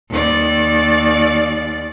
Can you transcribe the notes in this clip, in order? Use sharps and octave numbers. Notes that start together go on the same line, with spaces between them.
D#2 D5